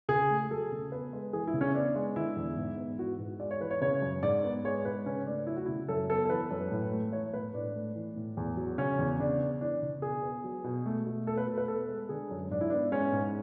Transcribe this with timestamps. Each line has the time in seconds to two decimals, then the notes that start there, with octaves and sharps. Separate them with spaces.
0.08 C#3 G#4
0.30 A3
0.51 F#3 A4
0.72 C#3
0.92 B3 B4
1.13 G#3
1.33 E3 G#4
1.47 E4
1.54 C#3
1.61 C#4
1.75 B3 D4
1.96 G#3
2.16 D3 E4
2.36 E2
2.57 G#2
2.78 B3
2.99 E3 F#4
3.19 G#2
3.40 G#3 D5
3.51 C#5
3.60 E3 B4
3.71 C#5
3.81 C#3 C#5
4.02 F#2
4.22 G#2 D5
4.44 B3
4.65 G#3 C#5
4.85 G#2 B4
5.06 C#3 C#4
5.26 A3 D4
5.47 F#3 E4
5.57 F#4
5.66 C#3 E4
5.89 F#2 A4
6.09 B3 A4
6.25 A4
6.30 E3 B4
6.51 F#2
6.71 A2
6.92 A3
7.13 E3 C#5
7.33 A2 B4
7.54 A2 D4
7.75 A3
7.96 E3
8.16 A2
8.37 E2
8.57 F#3
8.78 C#3 C#4
8.99 E2
9.19 C#3 D4
9.40 B3
9.61 E3 D4
9.82 C#3
10.02 B2 G#4
10.23 B3
10.44 F#3
10.64 B2
10.86 A3
11.07 B2
11.26 A3 A4
11.37 B4
11.48 B2
11.58 B4
11.68 B3 A4
11.89 G#3
12.09 D3 G#4
12.31 F#2
12.50 G#2 D4
12.61 E4
12.70 B3 D4
12.92 G#3 C#4
13.12 G#2